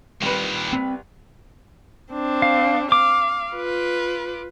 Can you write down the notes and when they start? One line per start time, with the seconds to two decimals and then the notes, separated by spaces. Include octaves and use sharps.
0.22 C2 A#2 D#3 B4
0.73 C4
2.13 C4 D4
2.42 F5
2.92 F5 D6
3.55 F4 B4